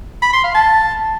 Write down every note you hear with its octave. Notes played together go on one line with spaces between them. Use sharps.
B5
C6
F5
A5